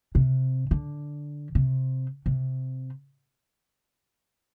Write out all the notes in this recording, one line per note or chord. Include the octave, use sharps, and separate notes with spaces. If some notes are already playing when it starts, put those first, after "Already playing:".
C3
D3
C3
C3